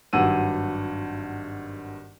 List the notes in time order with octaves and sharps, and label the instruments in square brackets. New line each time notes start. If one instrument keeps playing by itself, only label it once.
[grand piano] G#1 G2 F#3 F#5 E6 D#7